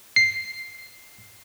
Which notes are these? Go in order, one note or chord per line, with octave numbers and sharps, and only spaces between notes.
C7